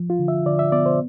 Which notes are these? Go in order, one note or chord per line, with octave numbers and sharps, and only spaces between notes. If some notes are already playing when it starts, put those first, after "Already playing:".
Already playing: F3
F4
D3
E5
D3 D5
E5
B3 D5
C5